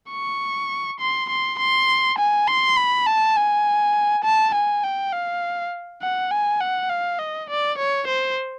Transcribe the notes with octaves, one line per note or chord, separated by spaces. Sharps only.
C#6
C6
C6
C6
G#5
C6
B5
A5
G#5
A5
G#5
G5
F5
F#5
G#5
F#5
F5
D#5
D5
C#5
C5